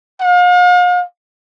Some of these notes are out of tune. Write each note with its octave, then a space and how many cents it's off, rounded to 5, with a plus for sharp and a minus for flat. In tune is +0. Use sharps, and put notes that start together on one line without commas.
F5 +40